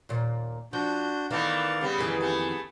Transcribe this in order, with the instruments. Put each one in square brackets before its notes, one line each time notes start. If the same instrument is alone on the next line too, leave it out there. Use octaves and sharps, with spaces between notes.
[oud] D#2 A#2
[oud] F3 [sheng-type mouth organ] D4 F#4 G6
[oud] D#3 [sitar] E3 A3 B3 [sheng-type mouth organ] D5 F5
[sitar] C#3 G3 B3
[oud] F2 D#3 E3 [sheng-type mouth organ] G#4
[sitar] A3 B3